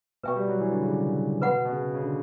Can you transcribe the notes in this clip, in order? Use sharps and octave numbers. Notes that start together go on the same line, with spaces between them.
B2 B4 E5 G5 C#6
G3
F#3
E3
D3
C#3
B2 B4 F#5 B5
B2
C#3
C#3
D3